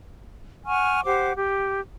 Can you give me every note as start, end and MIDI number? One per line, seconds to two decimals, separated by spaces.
0.65 1.01 78
0.65 1.01 80
0.65 1.01 85
0.65 1.01 89
1.04 1.31 67
1.04 1.31 72
1.04 1.31 78
1.04 1.31 86
1.34 1.78 67